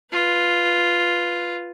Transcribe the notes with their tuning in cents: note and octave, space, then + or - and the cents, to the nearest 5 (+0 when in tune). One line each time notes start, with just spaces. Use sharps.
F4 +0 B4 +0